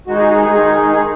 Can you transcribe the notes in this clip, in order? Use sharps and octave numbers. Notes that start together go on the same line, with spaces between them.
D#3 G#3 D#4 F#4
G#4
G#4
G#4
D#3 G#3 D#4 G#4
G#4